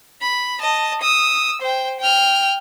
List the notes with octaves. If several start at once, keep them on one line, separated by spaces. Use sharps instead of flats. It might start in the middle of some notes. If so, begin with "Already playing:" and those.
B5
D#5 A5
D#6 E6
C5 G5
G5 F6